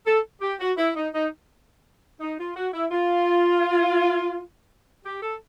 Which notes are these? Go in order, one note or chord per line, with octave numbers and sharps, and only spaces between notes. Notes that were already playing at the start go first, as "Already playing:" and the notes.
A4
G4
F#4
E4
D#4
D#4
D#4
F4
F#4
E4
F4
G4
A4